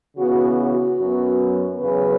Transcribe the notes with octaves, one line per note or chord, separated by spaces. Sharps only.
C#3 E3 B3 F#4
F#4
F#2 F#3 B3
E2 C#3 F#3 B4